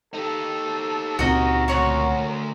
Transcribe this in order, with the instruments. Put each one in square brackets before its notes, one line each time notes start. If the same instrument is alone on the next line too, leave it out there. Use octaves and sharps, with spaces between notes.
[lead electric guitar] D#4 G4 [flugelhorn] A4
[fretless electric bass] C#2 A#2 C4 [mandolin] F#4 D#5 [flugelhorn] A#4
[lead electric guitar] D2 [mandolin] F#4 C#5 C#6